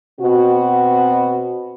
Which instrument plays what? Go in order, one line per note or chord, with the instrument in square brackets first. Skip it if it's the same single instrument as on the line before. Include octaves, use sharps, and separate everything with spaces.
[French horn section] B2 C4 F#4